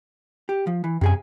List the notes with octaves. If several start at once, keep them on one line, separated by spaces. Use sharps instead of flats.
G4
F3
E3
F#2 C3 G#4 G#5